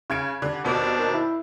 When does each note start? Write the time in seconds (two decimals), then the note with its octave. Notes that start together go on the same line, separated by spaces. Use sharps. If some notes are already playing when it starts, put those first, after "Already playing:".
0.10 C#3 G#6 D7
0.42 D3 G3
0.65 D#2 B2 C4 D4
0.99 D#3
1.13 E4